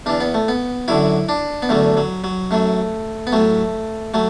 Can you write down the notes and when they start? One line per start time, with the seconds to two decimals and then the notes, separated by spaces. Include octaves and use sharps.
0.06 E2 E3 D4
0.20 B3
0.34 A3
0.48 B3
0.88 F#2 D3 F#3 E4
1.29 D4
1.62 B3
1.69 E2 D3 F#3 A3
1.97 F#3
2.24 F#3
2.51 F#2 F#3 A3
3.27 B3
3.32 A2 F#3 A3
4.14 F#3 A3